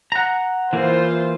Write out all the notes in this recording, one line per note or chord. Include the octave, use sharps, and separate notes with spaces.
F#5 A#5
E3 A#3 E4 F4 C5